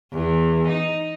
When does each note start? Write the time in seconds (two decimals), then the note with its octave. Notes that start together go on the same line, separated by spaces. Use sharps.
0.13 E2
0.68 D#4